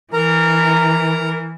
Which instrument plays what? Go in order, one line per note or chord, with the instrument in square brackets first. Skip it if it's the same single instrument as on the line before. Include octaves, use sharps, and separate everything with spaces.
[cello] E3 [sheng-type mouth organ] A#4 A#5